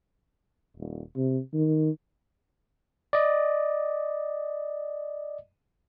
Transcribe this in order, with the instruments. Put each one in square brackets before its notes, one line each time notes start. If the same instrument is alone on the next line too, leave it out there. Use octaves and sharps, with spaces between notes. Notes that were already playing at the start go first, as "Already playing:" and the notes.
[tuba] D#1
C3
D#3
[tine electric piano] D5 D#5